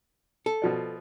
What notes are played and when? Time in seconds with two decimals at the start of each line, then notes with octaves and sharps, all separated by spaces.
0.46 A4
0.62 B2 F3 D5